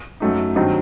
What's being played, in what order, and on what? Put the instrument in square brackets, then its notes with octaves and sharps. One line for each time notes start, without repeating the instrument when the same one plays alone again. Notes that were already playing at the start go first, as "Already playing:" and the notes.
[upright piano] F#2 F#3 A3 D#4
G2 D#3 F#3 C4 D#4